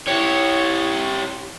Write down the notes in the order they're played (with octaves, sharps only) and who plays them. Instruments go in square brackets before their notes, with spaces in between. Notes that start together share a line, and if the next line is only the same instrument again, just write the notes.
[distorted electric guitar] E4 G4 [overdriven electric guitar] C#5